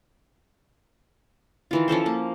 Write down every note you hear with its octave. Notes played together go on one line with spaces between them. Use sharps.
D#3 E3 F4
F3 C#4 A4 C5
A#3